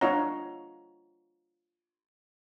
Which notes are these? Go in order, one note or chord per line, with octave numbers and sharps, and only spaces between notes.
D4 F4 C#5 D#5 F#5 A#5